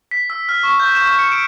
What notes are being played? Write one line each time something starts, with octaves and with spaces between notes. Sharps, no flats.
B6
E6
F6
C#6
G6
E7
C#7
D7